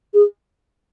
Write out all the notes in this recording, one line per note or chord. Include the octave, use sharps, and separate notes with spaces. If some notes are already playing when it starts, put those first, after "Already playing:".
G#4